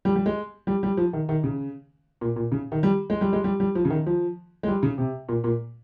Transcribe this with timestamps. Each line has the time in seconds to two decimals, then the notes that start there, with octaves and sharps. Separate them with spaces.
0.05 G3
0.16 G3
0.26 G#3
0.67 G3
0.83 G3
0.97 F3
1.13 D#3
1.29 D#3
1.44 C#3
2.21 A#2
2.36 A#2
2.52 C#3
2.72 D#3
2.83 G3
3.10 G#3
3.21 G3
3.33 G#3
3.44 G3
3.60 G3
3.75 F3
3.85 C#3
3.90 D#3
4.06 F3
4.63 G#3
4.68 G3
4.83 C#3
4.98 C3
5.29 A#2
5.44 A#2